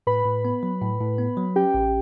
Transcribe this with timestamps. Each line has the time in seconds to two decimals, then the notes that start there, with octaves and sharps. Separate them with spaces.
0.07 A2 B4 B5
0.25 A2
0.45 B3
0.63 F#3
0.82 A2
1.01 A2
1.18 B3
1.37 F#3
1.56 C#4 G4 G5
1.74 A1